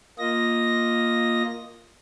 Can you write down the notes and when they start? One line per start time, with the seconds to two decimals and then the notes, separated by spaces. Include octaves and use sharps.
0.19 A#3 F4 D#5 A#6